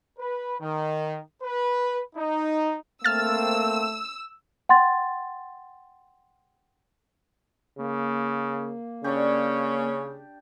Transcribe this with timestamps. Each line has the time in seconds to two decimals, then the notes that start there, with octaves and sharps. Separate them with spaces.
0.19 B4
0.60 D#3
1.42 B4
2.16 D#4
3.04 A3 A#3 C4 E6 F6 A6
4.69 F#5 G5 C6 A6
7.78 C#3 A#3
9.04 C#3 C#4 D4 G4